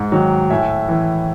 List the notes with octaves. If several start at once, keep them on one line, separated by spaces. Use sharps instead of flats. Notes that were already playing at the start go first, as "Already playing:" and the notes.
Already playing: G#2
D#3 F#3
A2 E5 G#5
E3